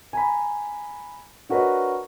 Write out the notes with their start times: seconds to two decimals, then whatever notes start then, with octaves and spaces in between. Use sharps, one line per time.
0.13 G#5 A#5 B5
1.49 D4 F#4 A#4 B4 C#5 D#5